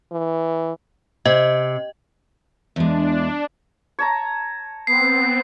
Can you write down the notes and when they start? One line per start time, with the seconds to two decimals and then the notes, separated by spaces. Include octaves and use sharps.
0.12 E3
1.26 C3 D#5
2.76 E2 G#3 D4
3.99 C#5 A5 A#5
4.87 B3 C4 C7